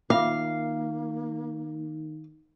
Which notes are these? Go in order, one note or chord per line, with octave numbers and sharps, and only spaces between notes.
D#3 A#3 F4 E5 F5 D6